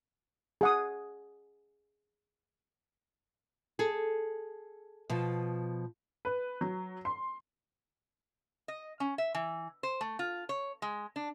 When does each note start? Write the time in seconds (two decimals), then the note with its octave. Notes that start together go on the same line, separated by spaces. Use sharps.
0.61 G#4 F#5 D#6
3.79 G#4 A4
5.10 B2 F3
6.25 B4
6.61 F#3
7.05 C6
8.68 D#5
9.00 C#4
9.18 E5
9.35 E3
9.83 C5
10.01 A3
10.19 F4
10.49 C#5
10.82 G#3
11.16 D4